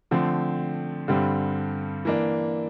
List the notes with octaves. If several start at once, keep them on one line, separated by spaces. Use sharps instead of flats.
D3 F3 A3 C4
G2 D3 G3 C4
E3 A#3 D4